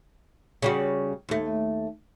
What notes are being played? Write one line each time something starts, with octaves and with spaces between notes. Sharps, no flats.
C#3 G3 F#4
D#2 A3